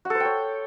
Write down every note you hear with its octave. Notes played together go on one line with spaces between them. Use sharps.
F#4
A4
C5
G5
C#5